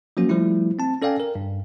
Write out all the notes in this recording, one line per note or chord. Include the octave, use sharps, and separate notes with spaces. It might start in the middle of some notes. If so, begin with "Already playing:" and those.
F3 F#3 A#3 C#4 F#4
F3 G3 A3 E4
C4 A5
C#4 A4 D5 F5 G5 G#5
A#4
G2